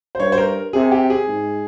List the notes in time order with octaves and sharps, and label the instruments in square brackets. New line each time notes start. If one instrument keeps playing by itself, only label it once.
[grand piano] C5
[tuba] G2 [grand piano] C#5
[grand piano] C5
A#4
[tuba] C3 [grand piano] G#4
[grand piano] G4
G#4
[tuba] G#2